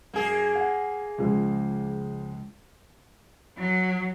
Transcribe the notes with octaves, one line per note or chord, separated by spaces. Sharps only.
F#2 A#3 G#4
F#5
C#2 F3 G#3
F#3